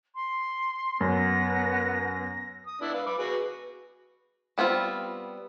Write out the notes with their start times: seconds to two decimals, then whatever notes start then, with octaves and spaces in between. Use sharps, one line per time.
0.15 C6
1.01 F#2 B3 A#6
2.67 D#6
2.81 B3 D4 E4
2.94 B4 F5
3.06 B5 D6
3.19 F#4 G#4 B4
4.58 G3 B3 C4 F4